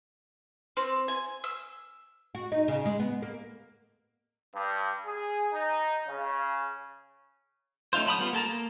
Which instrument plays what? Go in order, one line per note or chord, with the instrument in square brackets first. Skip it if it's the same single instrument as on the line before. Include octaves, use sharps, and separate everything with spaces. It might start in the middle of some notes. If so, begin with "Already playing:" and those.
[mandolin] C4
G#5
E6
[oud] F#4
D#4
C#3
G#3
B3
A#3
[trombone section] G2
G#4
D#4
C#3
[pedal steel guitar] A3 C#4 D#4 F4 C5
F#3 A5 B5 D6 D#6
G3 B3 F4
A#3 A4 A5 A#5
A#3